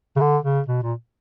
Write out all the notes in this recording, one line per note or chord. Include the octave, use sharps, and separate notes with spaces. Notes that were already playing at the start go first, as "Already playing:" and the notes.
C#3
D3
C#3
B2
A#2